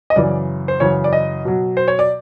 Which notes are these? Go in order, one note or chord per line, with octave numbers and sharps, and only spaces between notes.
D#5
F#2 C#3 E3 D5
C5
F#2 C#3 E3 C#5
D5
D#5
B2 F#3
C5
C#5
D5